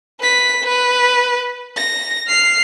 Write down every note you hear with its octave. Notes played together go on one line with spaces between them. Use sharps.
B4 B6
B4
A#6
F6 C7